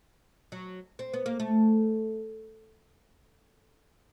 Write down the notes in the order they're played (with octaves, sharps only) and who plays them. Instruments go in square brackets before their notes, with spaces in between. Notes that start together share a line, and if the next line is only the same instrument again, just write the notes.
[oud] F#3
C4
B3
A#3
A3